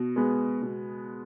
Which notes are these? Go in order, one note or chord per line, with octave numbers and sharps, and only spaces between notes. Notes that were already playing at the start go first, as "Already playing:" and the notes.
Already playing: B2
G#3 B3
B2